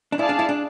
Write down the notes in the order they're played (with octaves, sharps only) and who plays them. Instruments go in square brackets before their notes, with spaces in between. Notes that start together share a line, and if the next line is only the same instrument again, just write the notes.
[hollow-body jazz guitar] D4
[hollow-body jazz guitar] E4 [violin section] G#4 D5 F5 A5
[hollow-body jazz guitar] D4
E4
D4